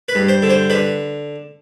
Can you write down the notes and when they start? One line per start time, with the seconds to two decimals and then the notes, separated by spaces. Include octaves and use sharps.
0.08 B4
0.15 G2
0.28 C5
0.42 D3
0.50 C5
0.70 D3 B4